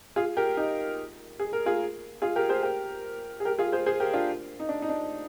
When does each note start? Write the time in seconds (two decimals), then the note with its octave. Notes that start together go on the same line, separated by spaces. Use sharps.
0.16 F4 G#4
0.37 G4 A#4
0.57 D#4 G4
1.40 G#4
1.53 A#4
1.66 F4 G#4
2.22 F4 G#4
2.36 G4 A#4
2.49 G#4 C5
2.63 G4 A#4
3.40 G#4
3.45 G4 A#4
3.59 F4 G#4
3.72 G#4 C5
3.86 G#4 C5
4.00 G4 A#4
4.13 D4 F4
4.60 D#4
4.69 D4
4.82 D#4
4.89 D4